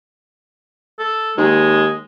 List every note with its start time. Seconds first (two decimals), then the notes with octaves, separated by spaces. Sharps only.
0.99 A4
1.37 D#2 G#3